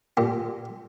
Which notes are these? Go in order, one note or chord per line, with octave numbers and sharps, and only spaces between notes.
A#2 G4